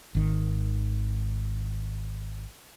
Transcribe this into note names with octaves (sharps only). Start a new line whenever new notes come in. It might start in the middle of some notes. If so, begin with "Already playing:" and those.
G#1 D#3